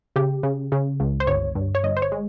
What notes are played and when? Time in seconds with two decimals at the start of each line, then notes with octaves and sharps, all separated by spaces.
0.16 C#3 G4
0.43 C#3
0.72 C#3
1.00 C#2
1.20 C5
1.27 G1 C#5
1.55 G2
1.75 C#5
1.83 G1 D#5
1.97 C5
2.02 C#5
2.12 G#3